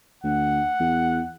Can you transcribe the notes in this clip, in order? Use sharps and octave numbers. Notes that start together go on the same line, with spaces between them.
D2 F#5
E2